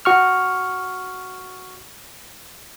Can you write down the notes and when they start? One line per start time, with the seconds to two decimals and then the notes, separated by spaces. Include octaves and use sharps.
0.05 F#4 C#6 F6